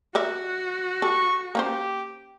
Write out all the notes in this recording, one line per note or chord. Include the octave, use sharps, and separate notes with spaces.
F#4 A#4 D5 E5
G4 A4 C#6
A#3 C#4 G4 C5